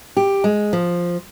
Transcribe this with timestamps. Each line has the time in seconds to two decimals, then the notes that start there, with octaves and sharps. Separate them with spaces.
0.17 G4
0.44 G#3
0.73 F3